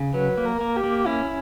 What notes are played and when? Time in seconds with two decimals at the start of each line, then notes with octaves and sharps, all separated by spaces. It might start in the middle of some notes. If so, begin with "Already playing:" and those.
Already playing: C#3
0.14 F#3 B4
0.37 A#3
0.45 A#4
0.61 A#3
0.76 G4
0.84 A#3
1.06 C#4 E4